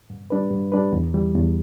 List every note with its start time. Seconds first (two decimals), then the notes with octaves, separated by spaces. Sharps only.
0.10 G2
0.30 G3 D4 B4
0.51 G2
0.72 G3 D4 B4
0.92 E2
1.14 E3 G3
1.35 E2